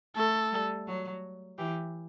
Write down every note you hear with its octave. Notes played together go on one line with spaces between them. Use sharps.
A3 A4
G3
F#3
E3 G4